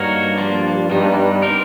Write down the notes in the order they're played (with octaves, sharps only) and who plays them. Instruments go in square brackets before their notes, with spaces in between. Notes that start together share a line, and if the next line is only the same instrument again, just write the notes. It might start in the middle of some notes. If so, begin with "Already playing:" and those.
Already playing: [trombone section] G2 [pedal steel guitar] A#3 D#4 F#4 A#4 C#5
[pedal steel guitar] F3 A#3 D4 F4
[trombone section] G2 [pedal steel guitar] G3 B3 D#4
[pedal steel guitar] C4 D#4 G4 A#4